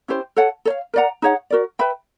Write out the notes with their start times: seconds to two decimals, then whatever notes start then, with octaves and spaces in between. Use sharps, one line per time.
0.08 C#4 E4 G4 C5
0.36 A4 C#5 F#5 A5
0.65 A4 C#5 F5
0.94 A#4 D5 F#5 A#5
1.22 D#4 G#4 C#5 F#5
1.50 F#4 A#4 D5
1.79 B4 E5 G5 B5